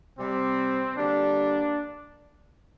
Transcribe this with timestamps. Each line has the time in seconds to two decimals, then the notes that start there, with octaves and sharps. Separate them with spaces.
0.19 C3 G3 C4
0.96 D3 G3 A#3 D4